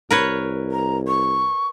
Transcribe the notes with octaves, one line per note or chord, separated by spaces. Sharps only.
C2 A#4 B4 C#5
A#5
C#6